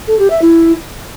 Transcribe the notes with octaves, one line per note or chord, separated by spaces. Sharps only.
A4
G4
E5
E4